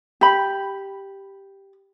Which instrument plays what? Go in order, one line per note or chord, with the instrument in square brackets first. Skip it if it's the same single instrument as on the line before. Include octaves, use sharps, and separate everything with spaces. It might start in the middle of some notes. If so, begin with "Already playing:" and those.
[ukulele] G4 B5